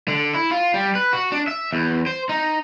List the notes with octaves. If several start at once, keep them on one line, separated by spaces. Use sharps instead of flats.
D3
E4
F4
G3
B4
F#4
D4
E5
E2
C5
D#4